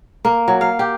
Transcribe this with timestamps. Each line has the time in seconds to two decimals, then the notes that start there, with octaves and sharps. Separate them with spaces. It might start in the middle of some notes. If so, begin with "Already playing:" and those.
0.25 A#3
0.48 F#3
0.61 F5
0.79 G4